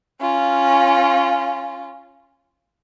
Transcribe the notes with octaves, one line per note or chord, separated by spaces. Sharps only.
C#4 F4